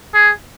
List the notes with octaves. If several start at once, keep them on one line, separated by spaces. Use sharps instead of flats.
G#4